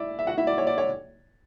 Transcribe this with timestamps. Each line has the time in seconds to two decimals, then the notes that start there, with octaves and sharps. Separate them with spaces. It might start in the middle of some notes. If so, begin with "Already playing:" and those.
Already playing: E4 D5 E5
0.19 E5
0.27 F#4 F#5
0.37 E4 E5
0.47 D5
0.58 C#5
0.67 D5
0.78 C#5